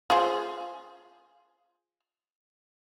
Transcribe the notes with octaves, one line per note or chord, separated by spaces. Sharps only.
F4 G#4 C5